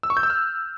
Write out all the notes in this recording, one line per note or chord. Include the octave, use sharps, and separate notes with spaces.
E6
C#6
G6
E6
F6